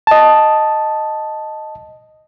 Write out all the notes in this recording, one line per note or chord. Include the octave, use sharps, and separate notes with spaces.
D#5 A5